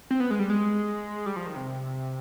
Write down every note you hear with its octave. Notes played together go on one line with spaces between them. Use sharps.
C4
B3
G#3
G3
G#3
G3
F3
D#3
C3